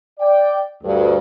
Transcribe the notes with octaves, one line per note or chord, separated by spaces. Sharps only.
D5 G5
D2 G2